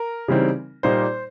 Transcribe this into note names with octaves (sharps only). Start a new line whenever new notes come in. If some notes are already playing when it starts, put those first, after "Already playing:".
Already playing: A#4
C#3 E3 G3 C4 D#4
A#2 G3 A#3 D#4 C5